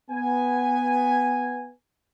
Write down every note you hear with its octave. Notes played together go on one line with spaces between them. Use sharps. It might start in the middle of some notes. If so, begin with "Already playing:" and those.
B3 G#5